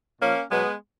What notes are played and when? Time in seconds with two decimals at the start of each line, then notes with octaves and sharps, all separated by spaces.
0.20 A#2 F3 A#3 C#4
0.50 B2 F#3 G#3 B3